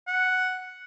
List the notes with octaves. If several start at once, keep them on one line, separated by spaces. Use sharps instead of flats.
F#5